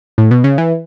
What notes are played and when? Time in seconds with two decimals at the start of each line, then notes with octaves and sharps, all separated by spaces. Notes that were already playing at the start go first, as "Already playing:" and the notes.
0.18 A2
0.31 B2
0.44 C#3
0.58 E3